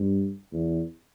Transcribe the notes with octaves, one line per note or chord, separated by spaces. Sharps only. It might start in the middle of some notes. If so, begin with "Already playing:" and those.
Already playing: G2
E2